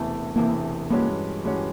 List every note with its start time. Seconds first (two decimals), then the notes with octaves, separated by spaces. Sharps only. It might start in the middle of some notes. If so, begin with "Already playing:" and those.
Already playing: E1 E2 C3 E3 A3
0.36 E1 E2 C3 E3 A3 A#3
0.90 G2 E3 G#3 A#3 C#4 F#4
1.44 G2 E3 G#3 A3 C#4 F#4